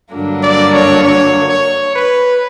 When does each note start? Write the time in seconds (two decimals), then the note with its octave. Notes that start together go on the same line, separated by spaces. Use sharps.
0.13 G2 D3 F#3 A#3 D4
0.43 D5
0.73 C#5
1.04 C#5
1.49 C#5
1.95 B4